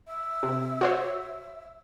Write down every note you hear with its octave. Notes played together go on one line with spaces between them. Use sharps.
E5
C3
F#4 C5 C#5